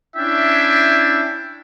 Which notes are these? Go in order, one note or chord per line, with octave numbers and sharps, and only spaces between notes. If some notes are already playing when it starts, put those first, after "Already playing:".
C#4 D4 E4 E5 G5